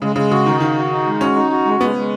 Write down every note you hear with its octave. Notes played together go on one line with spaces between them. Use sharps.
C#3 G#3
C#3 G#3
C#3 F#4
D#3 D#4
D#3 F#4
F#4
D#4
G#3
C#4 F#4
D#4
F#4
G#3
G#3 B3
G#3